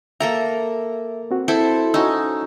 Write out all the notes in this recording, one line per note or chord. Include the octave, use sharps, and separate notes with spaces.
A#3 A4 E5 A#5
C4 F#4
E4 A4 C5
C#4 D#4 F#4 E6